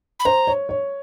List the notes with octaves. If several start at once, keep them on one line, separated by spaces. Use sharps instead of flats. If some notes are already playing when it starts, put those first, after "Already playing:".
B5
C5 A#5
C#5
C#5